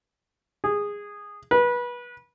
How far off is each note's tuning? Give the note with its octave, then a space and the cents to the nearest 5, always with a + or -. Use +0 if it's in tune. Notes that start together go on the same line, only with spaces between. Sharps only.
G#4 -15
B4 -25